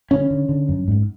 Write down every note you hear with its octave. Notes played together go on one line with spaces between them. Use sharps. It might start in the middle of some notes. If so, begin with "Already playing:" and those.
D3 C#4
D3
D3
F#2
G#2